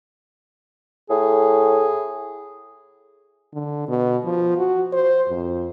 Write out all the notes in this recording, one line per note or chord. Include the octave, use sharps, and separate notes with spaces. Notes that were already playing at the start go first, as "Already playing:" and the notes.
A2 G#4
D3
B2
F3
F#4
C5
F2